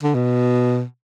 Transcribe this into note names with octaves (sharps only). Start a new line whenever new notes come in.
D3
B2